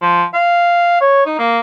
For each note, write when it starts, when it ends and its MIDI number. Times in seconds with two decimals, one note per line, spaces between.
0.02 0.24 53
0.33 0.98 77
1.01 1.25 73
1.26 1.37 63
1.39 1.60 58